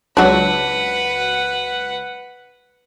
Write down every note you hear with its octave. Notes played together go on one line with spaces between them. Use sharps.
C#2 F#3 D4 F#4 B4 F#5